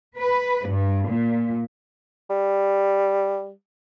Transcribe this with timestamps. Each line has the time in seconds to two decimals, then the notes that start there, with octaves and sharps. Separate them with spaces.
0.18 B4
0.67 G2
1.08 A#2
2.30 G3